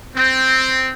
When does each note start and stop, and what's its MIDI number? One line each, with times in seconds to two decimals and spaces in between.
0.15 0.91 60